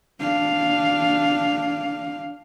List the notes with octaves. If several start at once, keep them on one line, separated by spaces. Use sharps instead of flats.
D4 F5